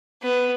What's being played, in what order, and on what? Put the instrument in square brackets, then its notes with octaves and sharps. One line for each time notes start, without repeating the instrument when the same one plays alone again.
[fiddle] B3